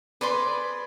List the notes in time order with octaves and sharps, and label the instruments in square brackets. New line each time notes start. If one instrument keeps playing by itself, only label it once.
[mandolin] C4 G#4 B5 [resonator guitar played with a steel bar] B4 [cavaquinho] D5 C6